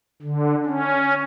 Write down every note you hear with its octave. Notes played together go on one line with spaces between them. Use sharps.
D3
C#4